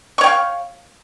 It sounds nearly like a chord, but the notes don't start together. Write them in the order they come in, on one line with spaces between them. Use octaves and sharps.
C#6 C#5 G5 F5